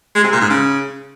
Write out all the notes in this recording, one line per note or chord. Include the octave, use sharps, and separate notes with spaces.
G#3
C3
A#2
G#2
C#3